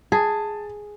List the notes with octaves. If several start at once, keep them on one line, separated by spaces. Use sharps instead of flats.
G#4 A5